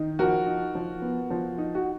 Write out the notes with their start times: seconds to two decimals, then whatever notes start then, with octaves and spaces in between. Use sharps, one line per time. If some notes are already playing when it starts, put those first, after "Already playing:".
Already playing: D#3 D#4
0.19 F3 F#4 A#4
0.47 D#4
0.75 F3
1.02 B3
1.30 F3
1.58 D#4
1.75 F#4